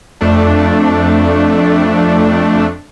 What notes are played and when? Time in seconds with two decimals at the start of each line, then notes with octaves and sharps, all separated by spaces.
0.21 F2 A3 D4